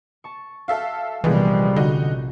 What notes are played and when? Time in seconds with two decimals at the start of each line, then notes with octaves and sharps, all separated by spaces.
0.24 A5 C#6
0.68 F#4 A4 E5 F5
1.24 A#1 C3 E3 F3 G3 G#3 B3 C#4
1.76 D3 D#4 F#4